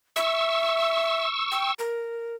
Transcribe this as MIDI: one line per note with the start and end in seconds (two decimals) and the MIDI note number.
0.16 1.26 76
0.16 1.74 85
0.16 1.74 88
1.51 1.71 79
1.79 2.36 70